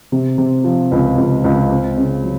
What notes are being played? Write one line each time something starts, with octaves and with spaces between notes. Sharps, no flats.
C3
C3
F3
C#2
C#2
C#2
C4
C#3
F#3